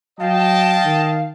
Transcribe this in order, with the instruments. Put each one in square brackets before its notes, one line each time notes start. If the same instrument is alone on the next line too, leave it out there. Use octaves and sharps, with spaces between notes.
[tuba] F#3 [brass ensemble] D#5 G5 A5 [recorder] F5
[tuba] D#3